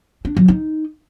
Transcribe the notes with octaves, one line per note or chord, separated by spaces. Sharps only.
D4
F#3
D#4